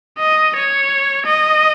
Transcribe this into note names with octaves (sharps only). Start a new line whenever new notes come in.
D#5
C#5
D#5